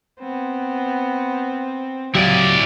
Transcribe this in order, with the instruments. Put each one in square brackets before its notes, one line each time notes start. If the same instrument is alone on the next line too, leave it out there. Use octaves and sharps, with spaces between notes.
[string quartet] B3 C4
[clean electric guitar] C#2 F#3 G4 [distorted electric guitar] E4 D5 [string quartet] F5